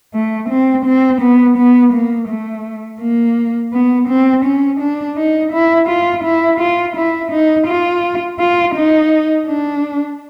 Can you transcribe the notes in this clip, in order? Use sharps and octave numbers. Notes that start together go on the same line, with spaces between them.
A3
C4
C4
B3
B3
A#3
A3
A#3
B3
C4
C#4
D4
D#4
E4
F4
E4
F4
E4
D#4
F4
F4
D#4
D4